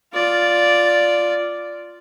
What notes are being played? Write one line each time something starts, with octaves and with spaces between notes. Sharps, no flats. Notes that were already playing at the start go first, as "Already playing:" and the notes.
F4 D5